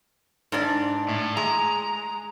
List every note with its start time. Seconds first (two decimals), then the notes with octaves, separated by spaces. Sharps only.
0.52 G#2 D4 D5
1.09 A2
1.37 G#3 A#5